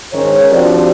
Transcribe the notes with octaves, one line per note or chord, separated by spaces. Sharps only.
G#2 D#3 C#4 C#5
F3 C4 D4 F#4 G4 D5